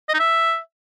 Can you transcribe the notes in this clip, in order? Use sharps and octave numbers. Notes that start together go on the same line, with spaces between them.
D#5
D#4
E5